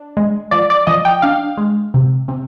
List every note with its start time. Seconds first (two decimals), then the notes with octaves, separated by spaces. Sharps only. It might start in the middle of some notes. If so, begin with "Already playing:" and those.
Already playing: D4
0.17 G#3
0.51 F3 D5
0.70 D5
0.87 F3 D#5
1.05 G5
1.22 D4 F5
1.57 G#3
1.94 C3
2.28 C3